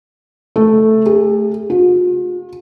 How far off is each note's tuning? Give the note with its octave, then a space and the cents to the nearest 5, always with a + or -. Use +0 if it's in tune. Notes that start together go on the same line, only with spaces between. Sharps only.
A3 -5
G#4 -45
F4 +45